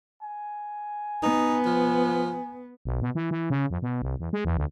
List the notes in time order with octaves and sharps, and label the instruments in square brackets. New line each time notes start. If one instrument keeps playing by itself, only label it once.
[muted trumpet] G#5
[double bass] B3 [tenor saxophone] D#4
[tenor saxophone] F3
[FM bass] B1
B2
E3
E3
C#3
F2
B2
C2
E2
G#3
E2
D2